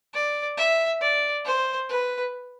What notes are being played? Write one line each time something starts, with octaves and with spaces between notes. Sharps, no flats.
D5
E5
D5
C5
B4